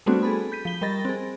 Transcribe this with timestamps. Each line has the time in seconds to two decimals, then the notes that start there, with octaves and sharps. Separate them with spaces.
0.06 G3 A3 B3 C4 D4 F#4
0.23 G#4 A4 B5
0.52 G6 B6 D#7
0.65 F3 G7
0.81 G3 A#4 D#5 B5 A6 A#6
1.05 C4 G#4